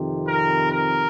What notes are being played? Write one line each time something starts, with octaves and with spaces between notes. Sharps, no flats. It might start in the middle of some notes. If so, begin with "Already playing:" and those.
Already playing: F2 C3 D#3
A#4
A#4